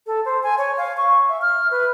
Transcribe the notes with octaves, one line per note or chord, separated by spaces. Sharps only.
A4
C5
G#5
C#5
F5
C#6
E5
F6
B4